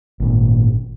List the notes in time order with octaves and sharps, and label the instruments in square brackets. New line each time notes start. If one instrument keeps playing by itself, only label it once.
[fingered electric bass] G#1 A#2